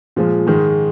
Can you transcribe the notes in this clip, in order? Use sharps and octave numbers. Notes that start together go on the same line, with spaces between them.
A#2 F3 G#3
G#2 D#3 G#3